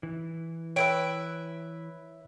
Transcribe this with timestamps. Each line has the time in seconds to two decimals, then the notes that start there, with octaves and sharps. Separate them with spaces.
0.03 E3
0.76 E4 B4 C#5 E5 G5 D7